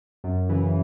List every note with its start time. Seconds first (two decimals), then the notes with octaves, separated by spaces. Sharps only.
0.24 F#2
0.49 C#3 E3